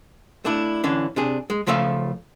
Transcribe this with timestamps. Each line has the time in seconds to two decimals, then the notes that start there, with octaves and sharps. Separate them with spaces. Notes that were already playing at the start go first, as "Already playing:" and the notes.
0.45 A3 D4 E4
0.83 D3 E3 C#4 D4
1.16 C3 D4 G#4
1.50 G#3
1.67 C#2 C#3 F3 A3 E5 F5